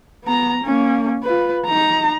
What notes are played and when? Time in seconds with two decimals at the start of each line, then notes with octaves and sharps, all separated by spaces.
0.24 B3 A#5
0.64 A#3 C#4
1.23 F4 B4
1.66 D#4 A#5